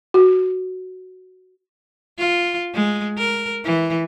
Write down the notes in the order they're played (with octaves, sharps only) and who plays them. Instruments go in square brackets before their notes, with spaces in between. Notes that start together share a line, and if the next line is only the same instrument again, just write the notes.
[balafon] F#4
[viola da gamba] F4
G#3
A#4
E3